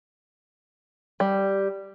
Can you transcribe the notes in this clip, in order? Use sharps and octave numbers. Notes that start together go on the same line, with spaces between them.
G3